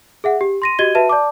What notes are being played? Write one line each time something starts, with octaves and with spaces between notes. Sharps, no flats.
G#4 E5 F#5
G4
C6 A#6 D#7
F#4 G4 D#5 G#6 D#7 G7
F#4 B4 E5 A5 D#7
D5 A5 D6